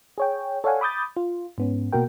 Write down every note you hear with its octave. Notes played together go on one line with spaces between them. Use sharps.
G#4 C#5 G5
A4 C#5 D5 F5 F#5 G#5
B5 D6 D#6 G6 A6
F4
G#2 B3 C#4
B2 A#3 F#4 A#4 G5